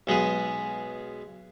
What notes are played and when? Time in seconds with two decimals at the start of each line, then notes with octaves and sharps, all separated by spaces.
0.07 B1 G#3 B3 G#4